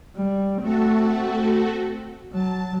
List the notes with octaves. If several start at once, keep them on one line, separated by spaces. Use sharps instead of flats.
G3
A3 C4 F#4 A4
F#3 A5